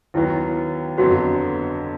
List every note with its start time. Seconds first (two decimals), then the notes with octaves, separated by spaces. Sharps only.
0.14 D#2 D#3 F#3 B3 E4
0.98 G1 F2 D3 F#3 B3 F#4